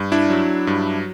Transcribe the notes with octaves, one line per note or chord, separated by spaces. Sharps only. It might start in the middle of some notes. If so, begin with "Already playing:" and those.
Already playing: G2
D4 E4
F#3
G2